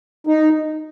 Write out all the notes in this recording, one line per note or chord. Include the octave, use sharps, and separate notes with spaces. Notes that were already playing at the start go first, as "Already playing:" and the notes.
D#4